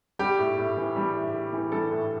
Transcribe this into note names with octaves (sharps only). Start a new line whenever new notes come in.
G3 G4
A2
A2
E3
G3
A2
A2
E3
G3 A4
A2